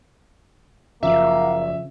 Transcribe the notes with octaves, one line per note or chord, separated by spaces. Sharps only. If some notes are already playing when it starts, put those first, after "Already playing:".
F#1 C#3 F3 A#3 E5